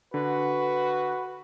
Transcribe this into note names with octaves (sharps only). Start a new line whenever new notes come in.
D3 F#4 B4